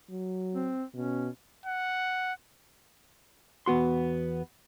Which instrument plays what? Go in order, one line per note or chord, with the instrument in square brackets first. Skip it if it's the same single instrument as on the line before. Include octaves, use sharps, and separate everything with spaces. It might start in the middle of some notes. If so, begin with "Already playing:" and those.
[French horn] F#3
[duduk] C4
[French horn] B2 [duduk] C#4
[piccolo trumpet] F#5
[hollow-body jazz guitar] E2 B3 F#4 C6